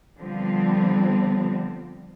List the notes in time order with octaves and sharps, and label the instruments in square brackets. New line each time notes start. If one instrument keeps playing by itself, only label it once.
[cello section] D3 F3 G3 B3 C4